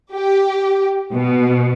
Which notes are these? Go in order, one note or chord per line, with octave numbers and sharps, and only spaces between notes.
G4
B2